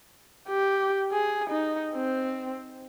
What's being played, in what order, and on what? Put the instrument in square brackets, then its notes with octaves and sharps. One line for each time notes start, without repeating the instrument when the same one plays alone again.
[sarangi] G4
G#4
D#4
C4